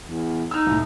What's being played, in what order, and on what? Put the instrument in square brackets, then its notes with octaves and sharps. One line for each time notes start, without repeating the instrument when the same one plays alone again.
[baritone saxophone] E2
[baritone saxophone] D#4 [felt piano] E6 F6
[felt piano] C2 A2